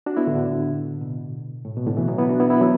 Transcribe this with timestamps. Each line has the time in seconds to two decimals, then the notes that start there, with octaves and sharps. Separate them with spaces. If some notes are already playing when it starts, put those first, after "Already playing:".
0.06 D4 F#4
0.17 B3 E4
0.27 A2 D3
1.01 B2
1.65 A2
1.77 B2
1.86 A2 D3
1.97 B2 E3
2.08 F#3 B3
2.18 B3 E4
2.29 D4 F#4
2.40 B3 E4
2.50 B3 E4
2.61 F#3 B3